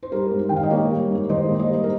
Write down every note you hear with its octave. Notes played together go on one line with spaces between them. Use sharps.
C5
G3 G4 A#4
G#2
D#3 G5
F5
D#5
A#3 A#4 C#5
G3
G#2
D#3 C5 D#5
A#3
C5 D#5
G3
A#4